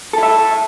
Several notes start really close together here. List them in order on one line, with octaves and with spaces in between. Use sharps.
A4 E4 E5